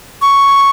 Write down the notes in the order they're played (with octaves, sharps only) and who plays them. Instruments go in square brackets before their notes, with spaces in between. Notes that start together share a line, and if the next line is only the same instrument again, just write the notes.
[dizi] C#6